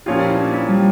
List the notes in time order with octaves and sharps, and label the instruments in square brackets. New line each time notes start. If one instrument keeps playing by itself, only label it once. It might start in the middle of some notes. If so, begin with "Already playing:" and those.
[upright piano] A#2 F3 C#4 F4 [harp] G4
[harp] E4
D4
E4
G3